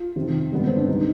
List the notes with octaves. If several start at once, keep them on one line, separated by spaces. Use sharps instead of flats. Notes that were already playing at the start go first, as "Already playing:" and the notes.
Already playing: F4
F2 C3 D#3
G2 D3 G#3 B3
C4
D4
C2 B2 G3 D#4